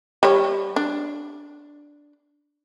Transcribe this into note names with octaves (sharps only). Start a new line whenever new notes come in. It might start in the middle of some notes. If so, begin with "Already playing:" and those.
G3 C#5
D4